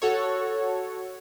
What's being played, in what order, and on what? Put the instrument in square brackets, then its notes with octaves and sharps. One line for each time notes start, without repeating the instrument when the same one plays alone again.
[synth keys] F#4 A4 C#5